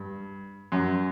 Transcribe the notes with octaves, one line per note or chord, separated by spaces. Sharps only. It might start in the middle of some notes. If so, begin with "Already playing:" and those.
Already playing: G2
F#2